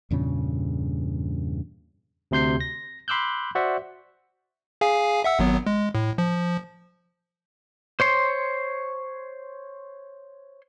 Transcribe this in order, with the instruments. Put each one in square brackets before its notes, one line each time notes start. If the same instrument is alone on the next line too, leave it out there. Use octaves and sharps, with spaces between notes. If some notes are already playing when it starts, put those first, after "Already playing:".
[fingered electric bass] E2 G2 A#2 C#3
[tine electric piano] D2 C3 C6 G6 C7
A#6
B5 C6 D6 E6 F#6 G6
F#4 C5 D5 E5 F#5
[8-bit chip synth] G#4 F5 G#5
E5 F#5 E6
G#1 F#3 B3
G#3
A2
F3
[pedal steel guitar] C5 C#5 C6